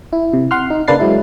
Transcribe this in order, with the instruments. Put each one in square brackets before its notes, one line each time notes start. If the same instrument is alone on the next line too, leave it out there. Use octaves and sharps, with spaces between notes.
[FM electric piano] E4
C3
F#5 C6 F6
D#4
C#3 A#3 D4 B4 A6 C7
F#3 G#3 E4